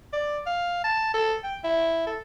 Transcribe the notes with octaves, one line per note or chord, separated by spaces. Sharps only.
D5
F5
A5
A4
G5
E4
A4